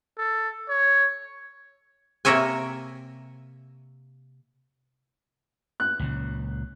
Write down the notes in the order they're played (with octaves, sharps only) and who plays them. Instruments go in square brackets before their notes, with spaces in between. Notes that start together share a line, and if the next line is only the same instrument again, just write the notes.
[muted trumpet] A4
C#5
[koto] C3 A#3 A#4 C#5 E5 G#5
[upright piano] F#6
[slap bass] C#2 A#2 C#3